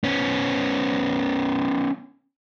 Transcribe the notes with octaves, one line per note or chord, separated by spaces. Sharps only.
B3 C#4